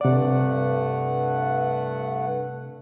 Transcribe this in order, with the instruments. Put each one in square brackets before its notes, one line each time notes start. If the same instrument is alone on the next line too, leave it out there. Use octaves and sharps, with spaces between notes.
[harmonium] G2 A3 F#5 [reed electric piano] C3 D5